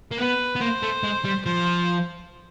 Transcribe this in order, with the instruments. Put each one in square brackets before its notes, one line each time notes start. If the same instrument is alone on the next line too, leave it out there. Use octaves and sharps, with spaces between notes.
[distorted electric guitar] A#3
[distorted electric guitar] B3 [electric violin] B4
[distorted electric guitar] B3
[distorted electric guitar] A#3 [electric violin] C5
[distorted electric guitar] A3
G#3
G3
[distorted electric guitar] F3 [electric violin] C5